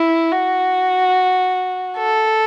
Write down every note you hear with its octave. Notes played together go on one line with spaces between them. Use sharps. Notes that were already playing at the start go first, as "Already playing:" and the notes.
Already playing: E4
F#4
A4